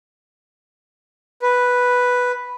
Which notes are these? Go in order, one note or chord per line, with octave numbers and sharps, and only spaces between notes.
B4